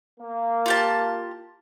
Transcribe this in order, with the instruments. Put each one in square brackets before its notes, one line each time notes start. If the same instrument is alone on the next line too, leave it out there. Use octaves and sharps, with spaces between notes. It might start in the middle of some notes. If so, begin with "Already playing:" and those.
[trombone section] A#3
[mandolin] F4 G4 A5